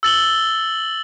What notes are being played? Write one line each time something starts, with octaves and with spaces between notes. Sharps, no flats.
E6 A6 F#7 G7